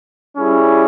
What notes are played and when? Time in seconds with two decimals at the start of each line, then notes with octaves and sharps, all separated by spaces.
0.38 G3 C#4 E4 G#4